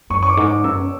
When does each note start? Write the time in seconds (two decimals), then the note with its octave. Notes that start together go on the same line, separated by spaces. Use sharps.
0.10 F#2 C#6
0.23 C#6
0.29 D6
0.37 G#2
0.47 D6
0.64 F#2 E6